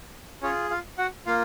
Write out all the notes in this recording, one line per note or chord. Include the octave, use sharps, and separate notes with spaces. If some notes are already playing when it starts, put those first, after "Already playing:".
C#4 F4 G#4 C#5
F4 F5
F#4 F#5
A#3 F4 F5